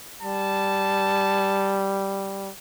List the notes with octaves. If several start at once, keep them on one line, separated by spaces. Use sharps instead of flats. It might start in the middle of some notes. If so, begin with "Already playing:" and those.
G3 A5